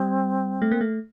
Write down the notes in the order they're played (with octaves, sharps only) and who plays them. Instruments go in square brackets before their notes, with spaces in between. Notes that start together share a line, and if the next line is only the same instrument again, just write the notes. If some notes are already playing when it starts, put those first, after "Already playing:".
Already playing: [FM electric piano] G3 [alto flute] C4
[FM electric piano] A3
A#3
A3